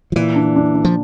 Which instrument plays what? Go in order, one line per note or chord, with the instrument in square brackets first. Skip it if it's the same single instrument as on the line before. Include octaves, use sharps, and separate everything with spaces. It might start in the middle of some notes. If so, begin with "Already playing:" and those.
[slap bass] F3
[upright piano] A#2 [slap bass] E3
[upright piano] D4
D4
D4
[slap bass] F3